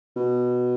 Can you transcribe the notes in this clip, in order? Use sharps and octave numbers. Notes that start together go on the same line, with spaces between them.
B2